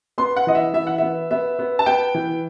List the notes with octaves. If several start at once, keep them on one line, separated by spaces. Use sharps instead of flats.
B3 C6
F#5
E3 D#5
E5
E3 E5
F#5
B3 E5
B3 E5
B3
A5
B3 G5
E3